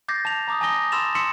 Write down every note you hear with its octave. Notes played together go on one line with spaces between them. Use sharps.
D6 G6 A6 A#6 C7
A5 F7
A#5 D6 D#6
G#5 A5 D6 D#6 A#6 G7
B5 C6 E6 A6 E7 F7
C6 E6 B6 C#7 E7 F#7